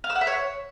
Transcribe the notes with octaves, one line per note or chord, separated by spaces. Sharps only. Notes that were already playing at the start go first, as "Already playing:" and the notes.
F5
E6
F#5
E5
C#5